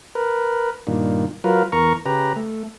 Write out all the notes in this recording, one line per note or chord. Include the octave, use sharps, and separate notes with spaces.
A#4 B4
G2 A#2 D#3
F#3 F4 A#4 B4
E2 A#4 A#5 C#6
C#3 G4 B4 A#5
A3